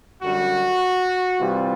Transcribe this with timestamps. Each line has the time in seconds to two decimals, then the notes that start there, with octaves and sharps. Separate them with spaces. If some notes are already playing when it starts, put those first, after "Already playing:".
0.22 F#2 D3 G3 F#4
1.39 C3 E3 G3 F4